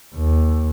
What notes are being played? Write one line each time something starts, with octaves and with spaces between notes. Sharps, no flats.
D#2